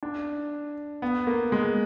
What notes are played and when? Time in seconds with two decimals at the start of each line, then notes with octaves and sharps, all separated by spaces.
0.03 D4
1.02 B3
1.27 A#3
1.52 G#3